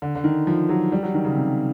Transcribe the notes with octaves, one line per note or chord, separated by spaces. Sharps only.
D3
D3
D#3
F3
F#3
G3
F#3
D#3
C#3
C3